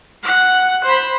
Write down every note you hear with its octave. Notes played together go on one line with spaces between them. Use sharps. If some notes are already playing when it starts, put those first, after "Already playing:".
F#5
C5 B5